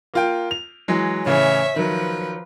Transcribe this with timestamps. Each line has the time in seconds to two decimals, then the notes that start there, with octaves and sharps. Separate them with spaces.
0.14 A#3 F4 G5
0.51 F7
0.88 E3 F#3 G#3
1.26 A2 C#3 E3 C#5 E5
1.76 D#3 F3 F#3 B4